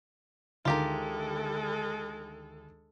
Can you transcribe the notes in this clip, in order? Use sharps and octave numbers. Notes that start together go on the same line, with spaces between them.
D2 D#3 G#3 F4 G4 A4 A#4